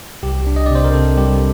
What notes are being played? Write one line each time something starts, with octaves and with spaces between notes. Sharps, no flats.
C2 G4
D4
D#5
D5
C3 C5
A#4
C3 A4
G3 G4